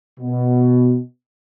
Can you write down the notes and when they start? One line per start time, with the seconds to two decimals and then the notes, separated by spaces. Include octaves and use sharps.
0.20 B2